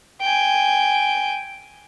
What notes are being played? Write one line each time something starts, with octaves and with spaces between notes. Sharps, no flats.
G5 G#5